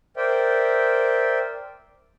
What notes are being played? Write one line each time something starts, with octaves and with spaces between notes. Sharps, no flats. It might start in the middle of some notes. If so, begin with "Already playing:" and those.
A#4 C5 D5 E5 G5